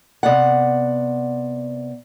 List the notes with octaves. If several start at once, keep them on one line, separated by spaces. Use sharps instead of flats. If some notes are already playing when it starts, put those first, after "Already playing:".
C3 B3 D5 F#5